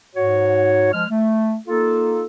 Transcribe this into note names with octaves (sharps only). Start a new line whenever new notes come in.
G#2 F#4 C#5
F3 G#3 F6
A3
A#3 D#4 F4 A4